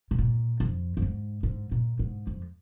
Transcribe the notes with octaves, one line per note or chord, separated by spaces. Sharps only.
C3
A#2
F2
F2
G#2
G#2
A#2
G#2
F2